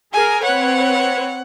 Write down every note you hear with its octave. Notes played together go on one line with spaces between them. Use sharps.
G#4 A#4 G#5
C4 B4 C#5 F#5